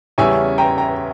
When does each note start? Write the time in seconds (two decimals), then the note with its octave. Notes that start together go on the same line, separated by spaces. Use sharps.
0.18 E2 C#3 G3 C#4 E5 G#5
0.58 G5 A#5
0.78 G5 A#5